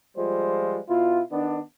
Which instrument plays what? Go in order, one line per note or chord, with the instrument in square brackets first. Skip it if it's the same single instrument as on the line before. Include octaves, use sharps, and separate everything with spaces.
[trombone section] F3 G3 G#3 F4 C5
B2 E4 F4
D#3 B3 D4